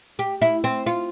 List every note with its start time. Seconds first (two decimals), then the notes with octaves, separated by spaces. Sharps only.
0.19 G4
0.42 E4
0.64 C4
0.86 F4